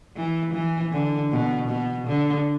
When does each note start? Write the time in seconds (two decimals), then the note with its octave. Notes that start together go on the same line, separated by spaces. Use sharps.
0.16 E3
0.53 E3
0.92 D3
1.32 B2
1.69 B2
2.07 D3